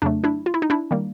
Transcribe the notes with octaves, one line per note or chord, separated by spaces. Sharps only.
F2 C#3 F#3 A3 D4
D4 E4
F4
E4
D#4
D4 E4
D#3 G3 A#3